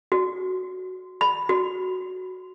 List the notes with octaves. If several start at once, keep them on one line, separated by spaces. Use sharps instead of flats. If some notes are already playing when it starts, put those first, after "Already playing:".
F#4
B5
F#4